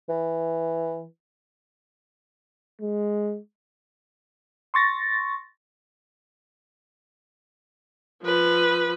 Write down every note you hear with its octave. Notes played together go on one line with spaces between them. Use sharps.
E3
G#3
C6 C#6 A6 A#6
F3 B4